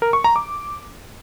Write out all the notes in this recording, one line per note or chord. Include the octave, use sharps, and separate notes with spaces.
A#4
C#6
A#5
D6